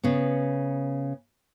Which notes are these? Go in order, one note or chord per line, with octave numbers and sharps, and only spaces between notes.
C#3 B3